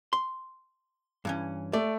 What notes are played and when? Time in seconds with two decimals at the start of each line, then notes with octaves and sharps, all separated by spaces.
0.13 C6
1.25 G2 E3 C#4
1.73 A3 D5